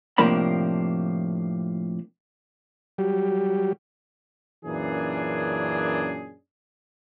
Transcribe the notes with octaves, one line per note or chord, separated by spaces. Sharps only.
A2 C3 F3 A#3 D4 B5
F#3 G3 G4
F#2 A#2 E3 C#4 D4 G#4